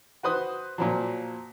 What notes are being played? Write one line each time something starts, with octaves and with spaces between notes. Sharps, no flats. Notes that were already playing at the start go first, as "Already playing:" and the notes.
F#4 B4 C5 D#6 F#6
A#2 F3 F#3